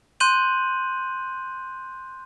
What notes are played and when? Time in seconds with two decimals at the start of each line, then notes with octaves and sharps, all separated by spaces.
0.20 C6 F#6 G6 D#7 F#7